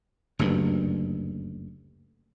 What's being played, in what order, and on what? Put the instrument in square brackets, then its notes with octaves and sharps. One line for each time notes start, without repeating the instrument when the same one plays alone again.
[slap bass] F#1 D2 G2